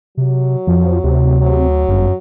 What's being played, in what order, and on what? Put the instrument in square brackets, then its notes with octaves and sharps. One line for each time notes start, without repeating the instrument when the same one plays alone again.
[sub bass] C3 [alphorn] F#3
[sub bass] F2 [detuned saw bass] F3
[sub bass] D2 [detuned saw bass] C3
[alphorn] F#3
[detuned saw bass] G1 [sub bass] F#2